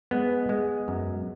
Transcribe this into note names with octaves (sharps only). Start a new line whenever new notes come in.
G#3 B3
G#3
F#2